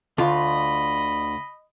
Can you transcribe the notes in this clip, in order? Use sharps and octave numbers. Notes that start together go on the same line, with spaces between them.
D2 F4 D#5 B5